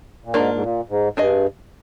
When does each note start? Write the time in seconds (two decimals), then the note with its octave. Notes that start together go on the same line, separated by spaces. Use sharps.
0.25 A#2
0.34 G#2 A#3 D4 F4 A#4
0.54 G#2
0.62 A#2
0.89 G#2
1.17 G2 D4 G#4 D#5